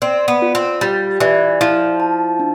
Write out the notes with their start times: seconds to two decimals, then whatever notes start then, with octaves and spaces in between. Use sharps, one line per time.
0.02 C4 D5
0.28 B3
0.42 F4
0.55 C4
0.81 G3 F4
1.20 E3 D5
1.61 F3 E4
2.00 A5
2.40 D4